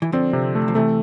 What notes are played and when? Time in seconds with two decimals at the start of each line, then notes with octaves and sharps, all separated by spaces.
0.02 E3
0.12 D3 F3 C4
0.33 C3
0.55 A3
0.68 F3
0.75 C3 E3 A3